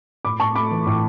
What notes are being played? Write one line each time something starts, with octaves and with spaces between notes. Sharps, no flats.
A2 B5 D6
A2 A5 C#6
A3 B5 D6
E3
A2